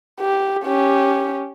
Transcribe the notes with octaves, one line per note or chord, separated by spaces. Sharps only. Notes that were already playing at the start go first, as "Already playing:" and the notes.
G4
C#4 G4